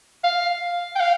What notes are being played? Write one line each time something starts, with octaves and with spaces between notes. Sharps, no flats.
F5
G5
F5